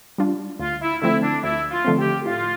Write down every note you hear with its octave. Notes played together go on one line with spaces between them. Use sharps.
G3 D4 F4
D2 F4
E4
D3 F3 A3 C4 E4
D4
D2 E4
F4
D3 F3 A3 C4
G4
A2 F4